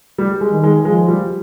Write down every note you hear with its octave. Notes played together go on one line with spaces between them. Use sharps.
G3
G#3
D#3
G#3
F3 G#3
G3